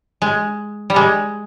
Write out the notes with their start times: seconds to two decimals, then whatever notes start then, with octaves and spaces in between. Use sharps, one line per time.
0.22 G#3
0.90 G3
0.96 G#3